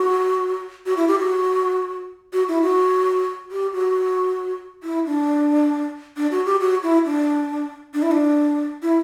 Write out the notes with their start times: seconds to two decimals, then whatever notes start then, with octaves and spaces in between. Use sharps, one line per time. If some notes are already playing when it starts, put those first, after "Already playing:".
Already playing: F#4
0.86 F#4
0.97 E4
1.08 G4
1.19 F#4
2.33 F#4
2.48 E4
2.62 F#4
3.51 G4
3.73 F#4
4.83 E4
5.06 D4
6.17 D4
6.31 F#4
6.46 G4
6.61 F#4
6.83 E4
7.05 D4
7.94 D4
8.03 E4
8.11 D4
8.83 E4